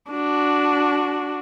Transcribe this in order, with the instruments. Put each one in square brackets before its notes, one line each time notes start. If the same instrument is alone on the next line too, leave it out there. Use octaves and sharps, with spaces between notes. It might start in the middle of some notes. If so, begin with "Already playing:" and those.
[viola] D4 F#4